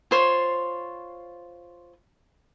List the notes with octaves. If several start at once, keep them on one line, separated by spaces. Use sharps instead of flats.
F4 C5 C#5